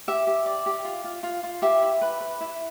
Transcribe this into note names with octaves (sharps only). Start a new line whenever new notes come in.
G4 E5
G4
D5
G4
F4
F4
F4
F4
G4 E5
E4
B4
B4
E4